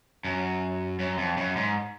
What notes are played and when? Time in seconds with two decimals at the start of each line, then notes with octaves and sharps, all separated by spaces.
0.25 F#2
0.99 F#2
1.18 F2
1.37 F#2
1.56 G#2